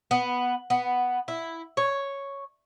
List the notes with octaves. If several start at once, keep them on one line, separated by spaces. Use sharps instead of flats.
B3
B3
E4
C#5